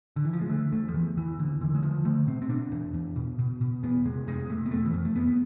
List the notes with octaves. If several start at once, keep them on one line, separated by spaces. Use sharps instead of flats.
D3
E3
F3
G#3
D3 A3
E2 A3
F3
E2 E3
E2 E3
E2 D3
D3 E3
G#3
D3 F3
D3 A3
B2 C4
C4
B2 D4
E2
E2
B2
B2
B2
E2 B3
C3 G#3
F2 G#3
C3 A3
B3
F2 A3
E3
F2 F3
A3
F2 B3
B3